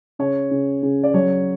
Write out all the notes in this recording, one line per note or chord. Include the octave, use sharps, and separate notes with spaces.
C#3 C#5
C#3
C#3
D5
F#3 C#5